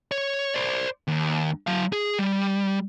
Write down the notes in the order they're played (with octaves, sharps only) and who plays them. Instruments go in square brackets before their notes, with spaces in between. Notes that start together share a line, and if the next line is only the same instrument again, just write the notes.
[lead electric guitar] C#5
C5 D5
D#2
F#3 F5
G#4
G3